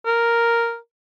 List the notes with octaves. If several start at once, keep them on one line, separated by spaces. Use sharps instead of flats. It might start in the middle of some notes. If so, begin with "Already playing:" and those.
A#4